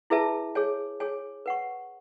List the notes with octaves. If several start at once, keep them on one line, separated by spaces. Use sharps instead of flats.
E4 G#4 B4 E5 A5
G#4 C#5 G#5
G#4 C#5 G#5
B4 F#5 C#6